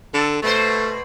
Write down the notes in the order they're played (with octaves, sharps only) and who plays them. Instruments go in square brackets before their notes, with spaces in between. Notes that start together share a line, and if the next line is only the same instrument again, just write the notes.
[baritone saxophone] D3 [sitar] A4
[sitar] B2 B4 C5 [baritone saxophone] A3